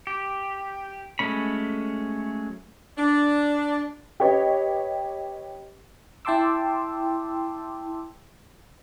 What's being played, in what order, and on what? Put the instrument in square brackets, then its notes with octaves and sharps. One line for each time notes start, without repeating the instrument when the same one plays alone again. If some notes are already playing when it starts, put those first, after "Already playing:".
[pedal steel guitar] G4
F#3 G#3 A3 C#4 B5
[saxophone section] D4
[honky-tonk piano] G4 B4 C#5 D#5
[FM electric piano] E4 G5 A5 C6 D6 E6